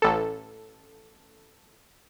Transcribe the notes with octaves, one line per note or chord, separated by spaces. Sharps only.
A1 A4